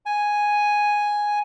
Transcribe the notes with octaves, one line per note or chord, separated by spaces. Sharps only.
G#5